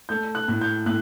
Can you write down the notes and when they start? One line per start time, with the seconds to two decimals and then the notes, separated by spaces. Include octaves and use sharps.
0.09 A3 G6
0.35 F#6
0.48 A2
0.61 G6
0.86 A2 F#6